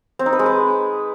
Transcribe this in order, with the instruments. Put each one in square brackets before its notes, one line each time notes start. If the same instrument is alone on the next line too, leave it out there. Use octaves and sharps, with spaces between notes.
[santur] C4
D#4
B4
G#3
B4